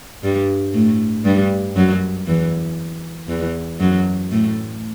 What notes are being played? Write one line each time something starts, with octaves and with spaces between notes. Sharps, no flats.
G2 G3
A2 A3
G2 G3
F#2 F#3
E2 E3
E2 E3
F#2 F#3
A2 A3